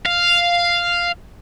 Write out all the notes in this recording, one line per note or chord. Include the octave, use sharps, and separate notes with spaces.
F5